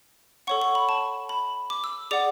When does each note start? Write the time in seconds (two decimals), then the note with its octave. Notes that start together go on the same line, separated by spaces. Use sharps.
0.47 A4 C#5 F#5 C#6
0.62 C#6
0.75 B5
0.89 A5
1.29 B5
1.70 D6
1.84 E6
2.11 G#4 D5 F#5 D6